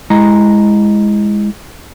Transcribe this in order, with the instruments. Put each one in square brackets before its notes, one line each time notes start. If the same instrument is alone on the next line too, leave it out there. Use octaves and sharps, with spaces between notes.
[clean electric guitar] G#3 E4 D#5 A#5